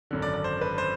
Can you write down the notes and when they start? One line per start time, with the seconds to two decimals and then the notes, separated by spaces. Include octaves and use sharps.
0.11 G#1 F#2 D3
0.22 D5
0.34 D5
0.44 C5
0.61 B4
0.78 C5